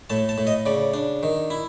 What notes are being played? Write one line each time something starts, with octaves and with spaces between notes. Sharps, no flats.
A2 A5
A5
A2
D#5
C#3 D5
D4
D#3
E4